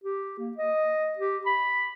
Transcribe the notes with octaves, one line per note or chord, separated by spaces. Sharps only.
G4
A#3
D#5
G4
B5